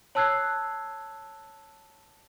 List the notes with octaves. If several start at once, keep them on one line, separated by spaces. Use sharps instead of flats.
C#5 A5 E6 F#6 G#6 C7